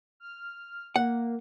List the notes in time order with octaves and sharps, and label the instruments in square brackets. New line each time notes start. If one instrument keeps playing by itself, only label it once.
[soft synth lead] F6
[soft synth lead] A#3 [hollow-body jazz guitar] F#5